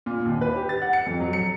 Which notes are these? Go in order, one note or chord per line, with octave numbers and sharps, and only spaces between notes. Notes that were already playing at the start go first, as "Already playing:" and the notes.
A#2
D#2
B4
G4
A6
F#5
C#7
F2
F#3
C#7